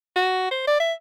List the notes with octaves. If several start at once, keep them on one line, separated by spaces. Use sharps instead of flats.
F#4
C5
D5
E5